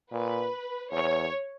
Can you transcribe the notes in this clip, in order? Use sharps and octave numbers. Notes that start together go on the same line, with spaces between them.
A#2 B4
E2 C#5